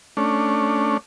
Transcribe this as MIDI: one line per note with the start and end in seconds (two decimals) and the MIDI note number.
0.17 0.97 57
0.17 0.97 61
0.17 0.97 62